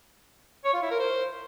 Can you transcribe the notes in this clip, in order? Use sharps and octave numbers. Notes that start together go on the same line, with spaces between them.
C#5
F4
E4
A#4
C5